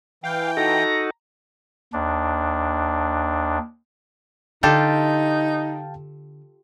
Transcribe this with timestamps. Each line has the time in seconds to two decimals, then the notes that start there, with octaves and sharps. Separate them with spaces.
0.24 E3 F5 G5
0.57 D#4 F#4 A4 A#5
1.93 D#2 D4
4.63 D3 D#4 F4 G4 A4 F5 G5 A5